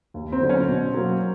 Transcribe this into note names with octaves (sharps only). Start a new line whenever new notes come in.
D#2
C4
D3 F#3 B3
C#4
B2
F#3 A#3